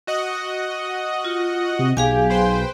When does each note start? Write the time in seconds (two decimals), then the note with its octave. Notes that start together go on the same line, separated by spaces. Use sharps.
0.07 F#4 D#5 F#5
1.25 F4
1.79 C3
1.97 B1 G4 G#4 F5 G#5
2.30 B4 C5 G5